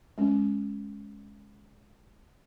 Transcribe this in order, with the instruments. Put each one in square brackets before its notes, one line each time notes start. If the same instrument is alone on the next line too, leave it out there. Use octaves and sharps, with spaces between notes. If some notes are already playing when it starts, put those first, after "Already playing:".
[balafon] G#3 C#4